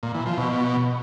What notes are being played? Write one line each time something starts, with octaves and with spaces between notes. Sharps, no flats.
A#2
E3
F3
B2